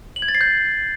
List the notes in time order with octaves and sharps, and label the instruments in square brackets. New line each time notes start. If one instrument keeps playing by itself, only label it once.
[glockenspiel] F#7
G#6
A6
C7
G6